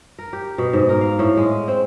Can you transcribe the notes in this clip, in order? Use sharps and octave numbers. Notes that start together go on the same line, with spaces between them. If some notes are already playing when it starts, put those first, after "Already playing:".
A#4
G4
B2
G#2
A#4
F5
A2
G#3
C4